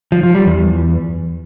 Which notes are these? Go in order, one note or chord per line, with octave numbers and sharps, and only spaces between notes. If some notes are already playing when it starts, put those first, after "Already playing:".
F3
F3
G3
E2